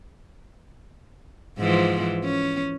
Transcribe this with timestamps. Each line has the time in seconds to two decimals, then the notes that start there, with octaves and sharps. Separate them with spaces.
1.59 G#2 E3 F3
2.24 C#4